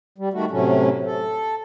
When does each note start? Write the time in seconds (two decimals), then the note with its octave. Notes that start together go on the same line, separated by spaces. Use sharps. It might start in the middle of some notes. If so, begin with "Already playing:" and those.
0.18 G3
0.33 D#3 G3 A3 F#4
0.51 A2 C3 F#3 A3 C#4
1.06 A4